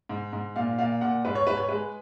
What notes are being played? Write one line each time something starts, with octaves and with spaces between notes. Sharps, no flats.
G#2
G#2
A#2 F5
A#2 F5
A#2 F#5
G#2 B4
C#5
G#2 B4
C#5
G#3 B4